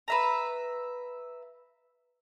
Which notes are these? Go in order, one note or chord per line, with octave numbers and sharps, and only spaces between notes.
B4 E5 A#5